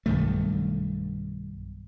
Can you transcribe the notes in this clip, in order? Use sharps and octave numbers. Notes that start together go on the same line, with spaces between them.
B1 G2 D#3 A3